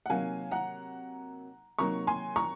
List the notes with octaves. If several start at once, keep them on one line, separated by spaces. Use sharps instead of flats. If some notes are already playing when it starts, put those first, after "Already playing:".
F#5
C3 F#3 A#3 D#4 F5 G#5
F#5 A#5
C3 F#3 A#3 D#4 A#5 C#6
G#5 C6
A#5 C#6